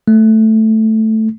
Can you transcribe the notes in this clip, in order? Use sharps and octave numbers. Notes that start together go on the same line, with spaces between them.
A3